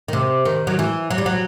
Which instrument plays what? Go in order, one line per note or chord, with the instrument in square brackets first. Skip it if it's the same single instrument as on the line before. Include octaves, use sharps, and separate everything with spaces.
[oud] D#3
C3
D#3
F#3
E3
F#3
G3
F#3